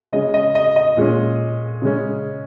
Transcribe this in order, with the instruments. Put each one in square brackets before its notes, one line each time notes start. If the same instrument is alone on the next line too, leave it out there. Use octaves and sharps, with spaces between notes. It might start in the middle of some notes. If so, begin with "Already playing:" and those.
[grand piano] C#3 G#3 C#4 D#5
D#5
D#5
D#5
A#2 G#3 C#4
C#3 G#3 C#4